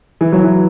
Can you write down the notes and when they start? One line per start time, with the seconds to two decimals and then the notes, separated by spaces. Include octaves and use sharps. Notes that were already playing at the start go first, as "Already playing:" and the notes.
0.21 E3
0.32 F#3
0.43 E3